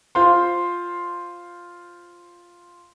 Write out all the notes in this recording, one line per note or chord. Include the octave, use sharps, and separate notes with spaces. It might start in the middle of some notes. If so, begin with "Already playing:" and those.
F4 C5 C6